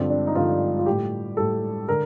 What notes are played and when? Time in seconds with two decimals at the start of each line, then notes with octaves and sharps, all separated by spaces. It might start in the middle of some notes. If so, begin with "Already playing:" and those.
Already playing: G2 D3 F3 C4
0.10 D4
0.27 D#4
0.35 G2 D3 F3 F4
0.79 F4
0.86 A2 G3 G4
1.37 A2 G3 A4
1.88 D3 A#4